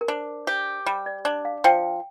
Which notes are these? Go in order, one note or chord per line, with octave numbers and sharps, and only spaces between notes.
A#4
D4 C5
G4 C5
G3 C5
D5
D4 D5
F5
F3 G5